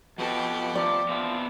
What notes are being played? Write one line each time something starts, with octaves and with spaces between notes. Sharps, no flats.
B2 F3 B3 G4 A4 A5
C3 F3 D5
F3 B3 C4 E5